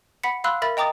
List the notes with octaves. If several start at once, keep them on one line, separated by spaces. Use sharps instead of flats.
F#5 B5 B6 C#7
F5 B5 C6 E6 F#6
A#4 E5 B5 A6
D#5 G5 A#5 D6 D#6 A6